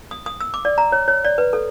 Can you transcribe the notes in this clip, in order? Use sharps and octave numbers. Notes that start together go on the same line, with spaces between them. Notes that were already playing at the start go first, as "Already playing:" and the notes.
D#6
D#6
E6
D6
D5
A#5
C#5
C#5
D5
B4
A4